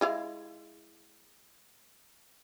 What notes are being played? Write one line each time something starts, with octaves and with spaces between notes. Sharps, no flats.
G#3 E4 F5